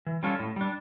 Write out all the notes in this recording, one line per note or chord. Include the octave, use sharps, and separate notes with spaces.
E3
G3 C#4 F4 A4
A2
G3 D4